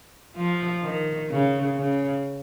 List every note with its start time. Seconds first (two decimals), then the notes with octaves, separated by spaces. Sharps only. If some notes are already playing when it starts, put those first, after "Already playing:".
0.36 F3
0.83 D#3
1.29 C#3
1.76 C#3